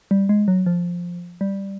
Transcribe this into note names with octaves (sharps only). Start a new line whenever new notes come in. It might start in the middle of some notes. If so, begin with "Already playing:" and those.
G3
G#3
F#3
F3
G3